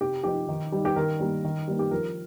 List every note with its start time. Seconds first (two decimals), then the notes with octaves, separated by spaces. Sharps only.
0.01 C3 G4
0.24 F3 D#4 G4
0.49 D#3
0.72 G3 D#4
0.85 G4
0.96 D#3 A#4
1.20 G3 A#3 D#4
1.44 D#3
1.68 G3 A#3 D#4
1.79 G4
1.91 F3 A#4